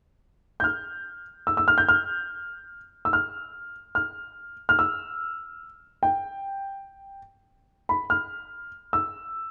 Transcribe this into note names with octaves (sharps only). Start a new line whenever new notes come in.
G6
F6
E6
E6
F6
G6
F6
E6
F6
F6
F6
E6
G5
B5
F6
E6